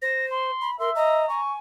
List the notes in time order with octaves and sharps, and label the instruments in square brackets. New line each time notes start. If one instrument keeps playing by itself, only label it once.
[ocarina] C5 [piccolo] A#6
[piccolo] C6
[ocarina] B5
[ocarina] A#4 [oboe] E5 [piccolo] C6
[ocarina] D#5 [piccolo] A#5
[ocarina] G#5 [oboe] C#6